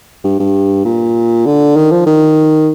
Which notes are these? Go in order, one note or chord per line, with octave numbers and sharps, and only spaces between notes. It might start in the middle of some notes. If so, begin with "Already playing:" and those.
G2
G2
A#2
D3
D#3
F3
D#3